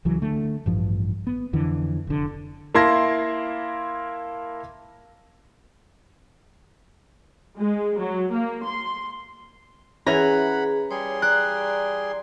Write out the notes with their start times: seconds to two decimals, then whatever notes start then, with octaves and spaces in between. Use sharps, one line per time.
0.05 C#2 E3 F#3
0.22 D3 A3
0.66 A1 G2 F3
1.27 B3
1.53 F2 D3 E3
2.07 F1 D3
2.75 A#3 E4 A5 C6 G#6 A#6
7.57 G#3
7.99 F#3
8.32 A#3
8.67 C6
10.07 E3 C#4 E4 G#4 F#5 A#5 B5
10.91 G3 G#4 C#5 C6
11.22 D5 A#5 F#6